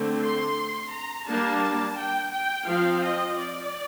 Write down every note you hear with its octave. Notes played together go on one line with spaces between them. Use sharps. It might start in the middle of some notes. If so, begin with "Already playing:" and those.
Already playing: D3 A3 C4
C6
A#5
G3 A#3 D4 A5
G5
G5
F3 C4 F5
D#5
D5